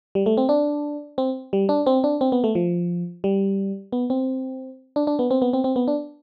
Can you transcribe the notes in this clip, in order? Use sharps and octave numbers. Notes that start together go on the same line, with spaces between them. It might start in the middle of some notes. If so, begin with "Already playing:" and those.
G3
A3
C4
D4
C4
G3
D4
C4
D4
C4
B3
A3
F3
G3
B3
C4
D4
D4
B3
C4
B3
C4
C4
B3
D4